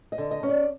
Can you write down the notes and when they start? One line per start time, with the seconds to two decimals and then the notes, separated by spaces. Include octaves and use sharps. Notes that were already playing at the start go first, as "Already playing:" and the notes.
0.12 D#5
0.18 D3
0.31 D#5
0.43 C#4
0.49 D5